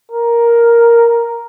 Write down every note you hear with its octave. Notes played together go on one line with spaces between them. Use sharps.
A#4